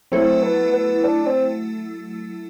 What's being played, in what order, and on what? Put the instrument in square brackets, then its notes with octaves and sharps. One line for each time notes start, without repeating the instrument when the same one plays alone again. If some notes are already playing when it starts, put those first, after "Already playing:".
[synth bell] F#3 A3 E4 A4 [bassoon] C4
[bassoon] B3
B3
D4
C4